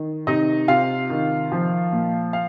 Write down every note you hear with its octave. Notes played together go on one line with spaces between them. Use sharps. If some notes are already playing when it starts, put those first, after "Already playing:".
Already playing: D#3
C3 D#4 D#5
C3 F4 F5
D#3
F3
A#2
F5